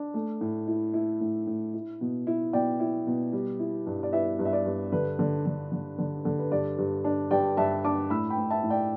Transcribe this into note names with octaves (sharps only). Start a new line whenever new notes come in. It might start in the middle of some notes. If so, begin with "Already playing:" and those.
Already playing: D4
A3
A2
E4
E4
A2
A2
E4
B2
E4
B2 D5 G5
E4
B2
G3
E4
G2
D5
E4 B4 E5
G2
E5
D5
G2
D3 B4
D3
D3
D3
D3
D3
B4
G2 D5
G2
D4
G2 D5 G5
G2 E5 A5
D4 A5 D6
A2 B5 E6
G5 B5
A2
E5 A5
A2
D5 G5